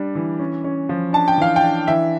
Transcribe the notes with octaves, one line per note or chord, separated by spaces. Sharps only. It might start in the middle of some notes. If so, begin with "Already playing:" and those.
Already playing: G3 D4
E3
C#4
C#4
F3
D4 A5
G5
E3 F5
G5
D4
E3 E5